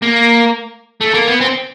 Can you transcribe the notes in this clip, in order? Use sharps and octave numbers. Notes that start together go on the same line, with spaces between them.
A#3
A3
A#3
B3
C4